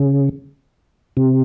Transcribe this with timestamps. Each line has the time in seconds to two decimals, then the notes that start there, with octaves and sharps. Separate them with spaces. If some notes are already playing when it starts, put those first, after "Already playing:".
Already playing: C#3
1.17 C3